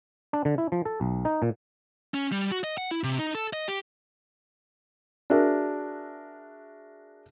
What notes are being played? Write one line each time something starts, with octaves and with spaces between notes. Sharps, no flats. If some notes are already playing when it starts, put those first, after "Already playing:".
D4
D3
E4
F3
A4
B1
D#4
A#2
C#4
G3
F#4
D#5
F#5
E4
C3
D#4
A4
D#5
G4
D4 F#4 G#4 A#4 E5